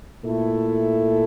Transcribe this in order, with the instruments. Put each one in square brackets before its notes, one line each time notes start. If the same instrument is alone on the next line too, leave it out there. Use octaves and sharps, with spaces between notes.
[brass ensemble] A#2 A3 E4 A4